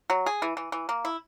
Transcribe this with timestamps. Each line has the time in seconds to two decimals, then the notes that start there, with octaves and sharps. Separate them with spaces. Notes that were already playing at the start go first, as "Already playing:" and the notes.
0.10 F#3
0.26 G#4
0.42 E3
0.57 E3
0.72 E3
0.89 A#3
1.05 E4